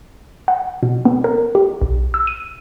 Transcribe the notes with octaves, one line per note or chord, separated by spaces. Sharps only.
F#5
B2
B3
A#4
G4
B1
E6
D#7